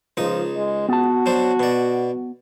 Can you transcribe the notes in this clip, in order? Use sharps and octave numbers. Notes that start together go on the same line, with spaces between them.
C#2 F3 D#4 D#6
G#3
B3 F#4 A5
F#3 D4 C5
B2 D5